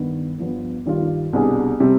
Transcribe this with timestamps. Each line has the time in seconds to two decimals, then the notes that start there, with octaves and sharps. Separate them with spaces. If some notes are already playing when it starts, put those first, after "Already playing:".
Already playing: G2 D#3 B3
0.38 G2 F3 B3
0.86 G2 D#3 G3 D4 F4
1.33 C2 B2 G3 D4 G#4
1.80 C3 G3 C4